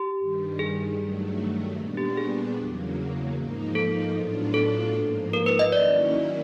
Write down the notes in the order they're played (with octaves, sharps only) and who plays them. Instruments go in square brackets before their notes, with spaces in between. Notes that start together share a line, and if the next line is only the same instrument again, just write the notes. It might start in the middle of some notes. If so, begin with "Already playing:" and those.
Already playing: [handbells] G4
[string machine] G2 D#3 G3
[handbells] G#4
[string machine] G2 D#3 F#3 A3
A#2 G3 B3 D4
[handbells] G4
G#4
[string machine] E2 C#3 F#3 A#3
G#2 F3 A#3 D#4
[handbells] A4
[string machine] A2 F#3 B3 D4 F4
[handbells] A4
[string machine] G#2 F3 A#3
[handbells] A#4
B4
D#5
[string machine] D#3 F#3 A#3 C#4 E4 [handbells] D5